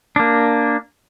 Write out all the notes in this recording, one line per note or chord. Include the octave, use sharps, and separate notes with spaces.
A#3 D4